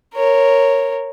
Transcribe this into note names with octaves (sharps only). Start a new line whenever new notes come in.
A#4 C#5